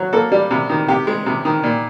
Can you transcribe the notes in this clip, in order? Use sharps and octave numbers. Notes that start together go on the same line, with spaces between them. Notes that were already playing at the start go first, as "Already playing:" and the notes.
Already playing: F#3
A#3 A4
G3
C3
D#3
C3 G4
G#3
C3
D#3
A#2